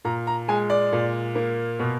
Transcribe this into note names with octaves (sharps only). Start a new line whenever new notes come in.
A#2 A#5
A#5
G#3 G#5
D5
A#2
A#3
B2